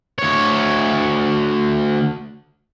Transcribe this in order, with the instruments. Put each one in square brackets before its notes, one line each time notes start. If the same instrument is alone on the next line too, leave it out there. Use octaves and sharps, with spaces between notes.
[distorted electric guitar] D2 C#5